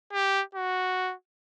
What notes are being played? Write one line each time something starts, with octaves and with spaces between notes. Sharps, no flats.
G4
F#4